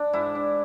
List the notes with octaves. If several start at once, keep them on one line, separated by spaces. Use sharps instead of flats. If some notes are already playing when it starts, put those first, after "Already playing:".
Already playing: D4
G#2 E4
D4